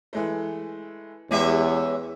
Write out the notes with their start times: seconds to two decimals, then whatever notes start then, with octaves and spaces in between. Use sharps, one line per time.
0.13 E3 G#3 A3
1.31 E2 G#3 C#4 G4 E5